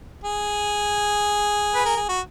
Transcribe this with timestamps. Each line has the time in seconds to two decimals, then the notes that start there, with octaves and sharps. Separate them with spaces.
0.24 G#4
1.75 B4
1.85 A#4
1.96 G#4
2.09 F#4